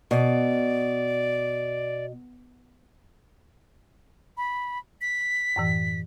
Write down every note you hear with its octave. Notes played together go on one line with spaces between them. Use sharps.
B2 D5
B5
B6
F#2 A2 E3